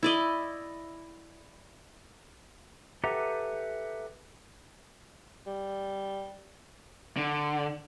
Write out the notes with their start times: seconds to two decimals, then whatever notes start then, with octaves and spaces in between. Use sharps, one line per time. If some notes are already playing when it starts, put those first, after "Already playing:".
0.03 E4 D5 D#5
3.04 G4 A4 B4 E5 F#5 A#5
5.46 G3
7.17 D3